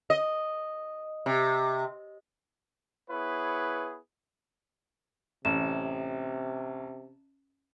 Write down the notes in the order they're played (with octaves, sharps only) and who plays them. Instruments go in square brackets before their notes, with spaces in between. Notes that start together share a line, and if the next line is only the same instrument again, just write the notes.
[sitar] D#5
C3
[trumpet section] B3 E4 G#4 B4 C#5
[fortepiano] A1 [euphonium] C3 [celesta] E7